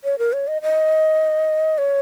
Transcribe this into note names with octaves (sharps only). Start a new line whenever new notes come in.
C#5
A#4
C#5
D#5
D#5
C#5